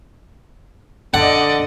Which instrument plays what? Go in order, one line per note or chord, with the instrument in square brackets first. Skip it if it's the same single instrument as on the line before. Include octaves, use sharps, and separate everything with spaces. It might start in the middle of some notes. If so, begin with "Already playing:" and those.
[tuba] D3 [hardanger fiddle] D5 D#5 [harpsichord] F#5